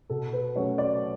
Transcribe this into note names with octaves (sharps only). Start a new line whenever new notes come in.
B2 A4
B4
F#3 A3 C#4 C#5
D5